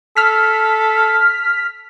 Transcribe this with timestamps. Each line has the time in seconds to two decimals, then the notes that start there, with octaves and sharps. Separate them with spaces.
0.17 A4 F6 B6